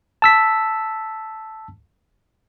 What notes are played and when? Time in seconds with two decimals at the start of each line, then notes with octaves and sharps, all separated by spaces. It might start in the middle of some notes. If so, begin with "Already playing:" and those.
0.22 A5 E6 B6